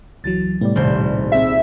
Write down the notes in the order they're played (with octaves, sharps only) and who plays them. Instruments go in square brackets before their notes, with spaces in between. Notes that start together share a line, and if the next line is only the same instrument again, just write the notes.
[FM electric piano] C#2 E3 F#3 [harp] A6
[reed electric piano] A2 C3 G3 [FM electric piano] B3 D5
[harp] D#1 C2 C5 [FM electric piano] A#2
[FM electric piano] C4 G#4 [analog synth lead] E5